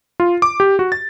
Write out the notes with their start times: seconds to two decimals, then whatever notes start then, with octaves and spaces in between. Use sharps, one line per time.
0.20 F4
0.42 D6
0.60 G4
0.79 F#4
0.92 A6